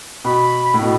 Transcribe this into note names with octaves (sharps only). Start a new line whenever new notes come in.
B2 B5
A2
B2